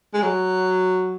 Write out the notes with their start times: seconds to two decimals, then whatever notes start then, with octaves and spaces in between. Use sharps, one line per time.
0.14 G#3
0.22 F#3